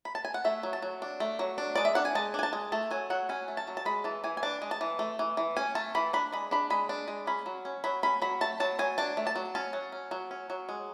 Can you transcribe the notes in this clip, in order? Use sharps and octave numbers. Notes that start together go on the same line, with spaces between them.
B5
A5
G#5
F#5
A3 E5
F#3
A5
F#3
D4
A3
F#3
D4
G#3 D5
E5
D4 F#5
G#5
G#3 A5
D4 G#5
A5
G#3
A3 A5
F#3 G#5
F#3 F#5
C#4 G#5
A3
A5
F#3
A5
G#3 B5
E3 A5
E3 G#5
G#5
D4 A5
G#3
A5
E3
A3
E3
E3
C#4 G#5
A3 A5
E3 B5
D4 B5
G#3 B5
D4 B5
G#3 B5
D4
G#3
C#4 B5
F#3
C#4
F#3 B5
C#4 B5
F#3 B5
A3 A5
F#3 A5
F#3 G#5
D4 A5
A3
A5
F#3
C#4 A5
F#3
C#4
F#3
C#4
F#3
G#3